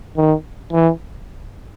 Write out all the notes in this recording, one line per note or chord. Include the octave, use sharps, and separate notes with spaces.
D#3
E3